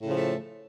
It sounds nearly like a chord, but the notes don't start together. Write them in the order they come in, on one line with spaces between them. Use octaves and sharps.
A2 C#3 F3 A3